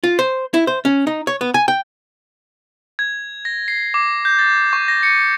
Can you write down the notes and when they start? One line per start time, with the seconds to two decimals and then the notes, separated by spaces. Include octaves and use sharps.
0.04 F4
0.19 C5
0.54 E4
0.67 C5
0.85 C#4
1.07 D#4
1.27 C#5
1.41 B3
1.54 G#5
1.68 G5
2.99 G#6
3.45 A#6
3.68 C7
3.94 D6
4.25 G6
4.39 A6
4.73 C#6
4.88 A#6
5.03 C#7